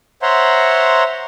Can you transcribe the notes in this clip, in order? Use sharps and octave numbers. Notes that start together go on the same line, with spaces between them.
C5 C#5 E5 F#5 A#5 C6